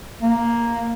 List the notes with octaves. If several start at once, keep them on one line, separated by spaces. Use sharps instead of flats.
A#3